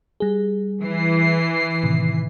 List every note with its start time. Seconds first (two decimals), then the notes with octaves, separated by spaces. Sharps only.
0.20 G3 G#4
0.83 E3 C7
1.83 A2 C3 D#3